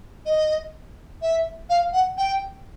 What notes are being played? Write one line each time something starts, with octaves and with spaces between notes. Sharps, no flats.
D#5
E5
F5
F#5
G5